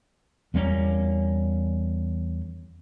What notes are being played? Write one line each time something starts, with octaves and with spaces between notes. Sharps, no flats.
E2 G3 A#3 C#4